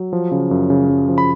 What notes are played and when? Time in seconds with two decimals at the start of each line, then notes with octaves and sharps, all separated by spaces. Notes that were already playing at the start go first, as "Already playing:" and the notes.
Already playing: F#3
0.13 F3
0.32 C#3
0.51 F#2
0.70 C#3
0.89 F#2
1.09 F3
1.18 B5